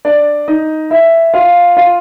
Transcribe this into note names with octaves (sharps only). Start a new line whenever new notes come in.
D4 D5
D#4 D#5
E4 E5
F4 F5
F4 F5